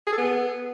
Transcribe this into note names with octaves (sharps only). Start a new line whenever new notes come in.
G#4
A4
B3